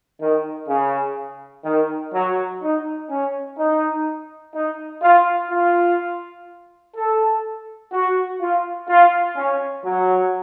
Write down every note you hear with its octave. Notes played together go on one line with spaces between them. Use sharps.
D#3
C#3
D#3
F#3
D#4
C#4
D#4
D#4
F4
F4
A4
F#4
F4
F4
C#4
F#3